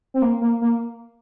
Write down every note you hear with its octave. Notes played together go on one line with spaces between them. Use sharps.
C4
A#3
A#3
A#3